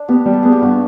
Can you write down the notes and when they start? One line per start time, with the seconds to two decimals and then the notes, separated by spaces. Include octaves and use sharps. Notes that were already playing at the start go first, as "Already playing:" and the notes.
Already playing: D4
0.08 B3 G4
0.26 G3
0.33 A4
0.43 B3 G#4
0.52 G4
0.61 G2 F#4